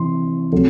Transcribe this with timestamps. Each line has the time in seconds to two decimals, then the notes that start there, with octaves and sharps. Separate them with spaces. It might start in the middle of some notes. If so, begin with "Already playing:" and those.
Already playing: C3 E3 C4 E4 C6
0.52 C3 F#3 A3